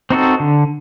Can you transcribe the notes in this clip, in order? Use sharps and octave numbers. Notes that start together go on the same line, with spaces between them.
C4 D#4 F#4 A4
D3